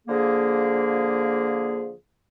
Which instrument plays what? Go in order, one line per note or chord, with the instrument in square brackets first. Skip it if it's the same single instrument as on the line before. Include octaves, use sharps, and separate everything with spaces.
[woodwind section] D3 F3 A#3 G#4